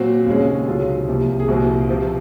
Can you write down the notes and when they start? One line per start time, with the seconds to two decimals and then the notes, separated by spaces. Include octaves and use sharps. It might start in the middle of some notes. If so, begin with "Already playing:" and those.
Already playing: A#2 F#3 C4 F#4
0.26 D#2 C#3 G#3 C#4
0.67 C#2 C3 D#3 F#3 C4 F4
1.07 C2 C3 F3 A#3
1.40 G#4
1.48 C2 A#2 F3 C4 F#4
1.89 C3 F3 C4